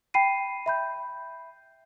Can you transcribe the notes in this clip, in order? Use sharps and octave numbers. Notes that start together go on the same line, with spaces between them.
G5 B5 C7 D#7
E5 B5 G6